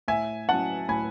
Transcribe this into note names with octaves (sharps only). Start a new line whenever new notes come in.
A2 E5 G#5
F#3 C#4 E4 F#5 A5
A2 G#5 B5